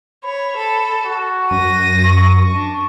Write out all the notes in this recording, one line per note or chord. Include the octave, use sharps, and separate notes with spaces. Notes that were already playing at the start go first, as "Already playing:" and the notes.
C#5 B5
A4
F#4
F#2 A#6 D#7
C#6
D4